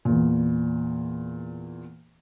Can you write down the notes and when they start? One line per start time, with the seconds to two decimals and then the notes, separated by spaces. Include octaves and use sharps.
0.05 E2 A#2